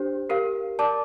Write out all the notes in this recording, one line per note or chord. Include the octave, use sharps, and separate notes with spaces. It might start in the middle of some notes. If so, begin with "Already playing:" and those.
Already playing: D4 G4 C5
G4 A#4 F5
A#4 D5 A5 D6